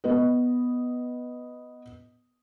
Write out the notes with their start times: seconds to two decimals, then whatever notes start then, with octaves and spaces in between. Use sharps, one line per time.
0.04 B3 B4 D#5